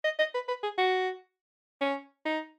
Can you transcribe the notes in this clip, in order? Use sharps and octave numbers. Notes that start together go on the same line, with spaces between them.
D#5
D#5
B4
B4
G#4
F#4
C#4
D#4